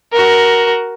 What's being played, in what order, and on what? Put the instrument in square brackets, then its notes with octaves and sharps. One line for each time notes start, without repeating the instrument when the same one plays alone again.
[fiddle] F#4 A#4